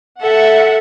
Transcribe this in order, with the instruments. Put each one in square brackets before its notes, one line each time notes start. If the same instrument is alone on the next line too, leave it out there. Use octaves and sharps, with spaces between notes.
[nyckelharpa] A4 [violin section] E5 F#5